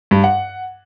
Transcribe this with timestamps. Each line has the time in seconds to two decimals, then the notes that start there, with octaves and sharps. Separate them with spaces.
0.11 G2
0.24 F#5